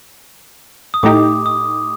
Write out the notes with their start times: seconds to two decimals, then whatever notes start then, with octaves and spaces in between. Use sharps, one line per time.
0.94 D#6
1.03 A2 A3 D#4 G4 D6
1.46 D#6